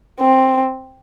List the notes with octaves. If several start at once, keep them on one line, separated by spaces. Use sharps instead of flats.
C4